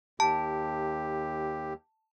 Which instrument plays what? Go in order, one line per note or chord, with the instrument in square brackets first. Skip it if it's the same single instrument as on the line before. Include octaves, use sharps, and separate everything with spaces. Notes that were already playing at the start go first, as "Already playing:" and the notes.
[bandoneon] D#2 G4 [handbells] A5